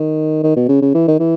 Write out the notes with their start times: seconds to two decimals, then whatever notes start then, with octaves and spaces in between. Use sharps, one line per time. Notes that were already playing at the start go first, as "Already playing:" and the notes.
Already playing: D#3
0.43 D#3
0.56 B2
0.69 C#3
0.82 C#3
0.94 E3
1.08 D#3
1.20 E3